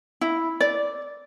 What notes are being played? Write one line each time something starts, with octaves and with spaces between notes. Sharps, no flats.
E4
D5